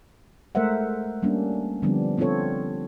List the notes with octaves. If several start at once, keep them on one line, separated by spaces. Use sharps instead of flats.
G#3 A3 A#4 C5 E5 F#5
G3 A#3 C#4 D4
D3 F3 G3 B3 C4 D4
B3 C4 D4 F4 A4 C#5